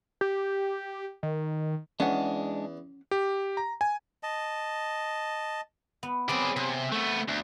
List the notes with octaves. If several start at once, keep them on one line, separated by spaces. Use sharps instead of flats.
G4
D#3
E2 G#3 C#4 D4 F#5
G4
A#5
G#5
D#5 A5
B3
F#3 B3 C4 G#4 D5
C3 G#4
A3 B3
D2